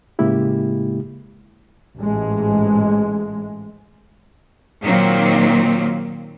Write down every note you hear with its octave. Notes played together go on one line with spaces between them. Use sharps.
A2 C#3 G#3 A#3 E4 G4
A1 G#2 G#3
A#2 D#3 F#3 A#3 C4